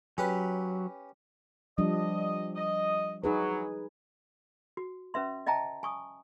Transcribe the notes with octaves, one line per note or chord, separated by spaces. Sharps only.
F#3 C#4 G4 B4
F3 G3 D4 D#5
D#5
F#3 D#4 G#4 B4
F#4
C#4 B4 E5 C6
D#5 E5 G5 A5 A#5
G#5 C#6 D#6